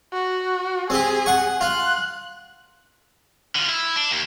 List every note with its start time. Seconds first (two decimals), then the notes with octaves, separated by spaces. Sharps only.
0.13 F#4
0.90 C4 G4 G#4
1.26 F#5 C#6
1.61 F4 F#6
3.55 D3 F4
3.69 E4
3.96 D4
4.12 D#2